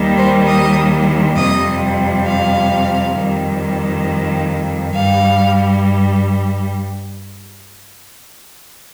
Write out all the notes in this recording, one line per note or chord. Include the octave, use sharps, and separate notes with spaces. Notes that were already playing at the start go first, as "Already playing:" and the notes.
Already playing: D#2 D#3 G3
C5
D#5
F2 C3 G3 D#5
F5
F2 D#3 G3
G2 G3 F5